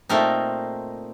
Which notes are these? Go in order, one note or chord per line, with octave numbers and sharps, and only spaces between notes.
A#2 A3 C4 D#4 A#4